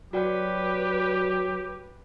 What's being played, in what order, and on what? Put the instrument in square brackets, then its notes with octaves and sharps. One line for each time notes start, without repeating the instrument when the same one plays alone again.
[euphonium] F#3 [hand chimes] F#4 D5 G5 [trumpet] G4 [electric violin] B4